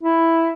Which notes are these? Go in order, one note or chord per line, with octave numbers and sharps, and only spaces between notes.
E4